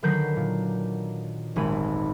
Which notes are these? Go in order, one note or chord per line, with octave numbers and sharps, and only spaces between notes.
D3 D#3 F#3 B4 G6 C7
A#2
D#1 G#1 G#3 B5 D#7